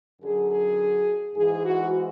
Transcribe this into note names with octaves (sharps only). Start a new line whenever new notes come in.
F#2 D3 F#3 G#4
G#4
G#2 E3 G#4
F#4